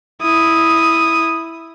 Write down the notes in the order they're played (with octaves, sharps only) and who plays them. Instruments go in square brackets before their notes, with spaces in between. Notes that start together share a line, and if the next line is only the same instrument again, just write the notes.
[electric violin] E4 D#6